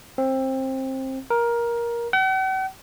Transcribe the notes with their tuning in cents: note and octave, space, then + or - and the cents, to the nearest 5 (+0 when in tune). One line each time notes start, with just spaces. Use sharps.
C4 +20
A#4 +15
F#5 +45